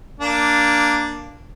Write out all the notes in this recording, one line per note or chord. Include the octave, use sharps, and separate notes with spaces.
A#3 D4